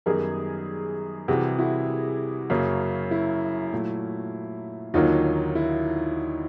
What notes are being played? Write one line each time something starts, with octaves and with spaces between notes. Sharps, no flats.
F#2 D#3 G3 B3 G#4 A#4
C3 E3 G3 F#4 G#4
E4 F#4
F#2 C#3 F#3 A#3
E4
A#2 F#3 A3
D#2 D3 F#3 A#3 D#4 F4
E4